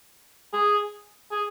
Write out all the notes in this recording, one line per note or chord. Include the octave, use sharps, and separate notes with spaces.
G#4
G#4